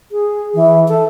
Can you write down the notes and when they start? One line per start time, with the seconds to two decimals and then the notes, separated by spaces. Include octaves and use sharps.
0.12 G#4
0.55 E3
0.88 A4